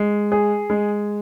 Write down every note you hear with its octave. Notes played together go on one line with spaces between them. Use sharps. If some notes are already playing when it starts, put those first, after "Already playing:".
Already playing: G#3
G#4
G#3